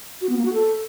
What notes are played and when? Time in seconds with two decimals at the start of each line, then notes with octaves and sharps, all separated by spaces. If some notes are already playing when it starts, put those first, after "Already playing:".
0.21 F#4
0.29 B3
0.37 A#3
0.45 F#4
0.53 A4